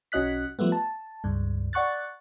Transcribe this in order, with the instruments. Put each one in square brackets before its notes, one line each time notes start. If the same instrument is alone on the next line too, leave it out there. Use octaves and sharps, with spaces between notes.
[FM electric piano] B1 C#4 F#4 D#5 F#6 B6
F3 G3 A3 B3
A5
C#2 G2
D5 F#5 C#6 F#6 A6